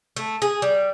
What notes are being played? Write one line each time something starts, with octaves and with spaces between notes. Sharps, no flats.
A3
G#4
G3